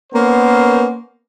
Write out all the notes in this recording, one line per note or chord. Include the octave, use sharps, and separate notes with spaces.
A#3 B3 C#4 A#4 C5